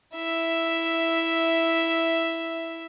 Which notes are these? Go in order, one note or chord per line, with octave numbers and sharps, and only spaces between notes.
E4 E5